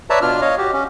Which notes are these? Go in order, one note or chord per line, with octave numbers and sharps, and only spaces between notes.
B4 C#5 D5 E5 A5 A#5
B2 D4 F4 F6
C#5 D#5 F5
F#4 G4
C#4